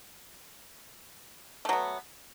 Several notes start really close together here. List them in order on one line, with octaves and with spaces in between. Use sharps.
A3 F#3 B3